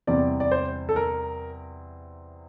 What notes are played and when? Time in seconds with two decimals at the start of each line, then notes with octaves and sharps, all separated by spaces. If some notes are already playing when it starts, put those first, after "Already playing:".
0.07 E2 C3 G3 C4 D5
0.40 D5
0.51 C5
0.89 A4
0.96 A#4